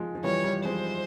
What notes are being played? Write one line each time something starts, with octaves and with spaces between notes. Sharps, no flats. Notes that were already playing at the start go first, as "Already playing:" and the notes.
Already playing: F3 G#3
F3
E3 G3 C#5
E3 G3
F3 G#3 C5